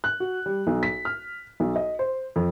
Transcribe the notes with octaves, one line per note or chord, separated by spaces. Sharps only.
F#6
F#4
G3
B1
B6
F6
B1
D#5
C5
F2